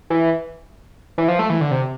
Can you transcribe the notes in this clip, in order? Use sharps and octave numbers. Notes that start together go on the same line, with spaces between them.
E3
E3
F3
A3
E3
D3
C3